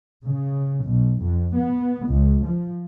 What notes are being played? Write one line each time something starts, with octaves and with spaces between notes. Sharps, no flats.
C#3
B1
F2
B3
C#2
F3